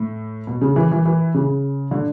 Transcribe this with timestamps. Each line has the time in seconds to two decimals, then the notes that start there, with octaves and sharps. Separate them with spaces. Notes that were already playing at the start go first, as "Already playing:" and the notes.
Already playing: A2
0.47 B2
0.61 C#3
0.76 E3
0.91 E3
1.05 E3
1.34 C#3
1.91 D3